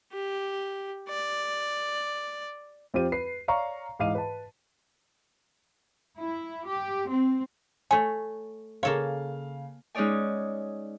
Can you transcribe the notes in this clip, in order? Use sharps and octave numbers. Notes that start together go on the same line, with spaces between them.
G4
D5
F2 C4 F4 G4 C5 D#7
B4 C7
C#5 D5 F5 A#5 C#6
G#2 E3 D#5 F5 D6 D#7
B4 A5
E4
G4
C4
A3 C#5 G#5
C#3 A#3 A4 C#5 F5
G#3 C#4 D#4 C#5 D5 G#5